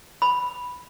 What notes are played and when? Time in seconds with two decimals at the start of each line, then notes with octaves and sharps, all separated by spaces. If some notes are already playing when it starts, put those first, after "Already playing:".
0.22 B5